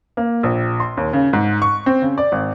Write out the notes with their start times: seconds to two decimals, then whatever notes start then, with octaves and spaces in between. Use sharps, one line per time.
0.17 A#3
0.43 A#1
0.80 C6
0.97 D#2
1.13 C#3
1.33 G#2
1.62 C#6
1.86 C4
2.02 C#3
2.18 D5
2.32 G#1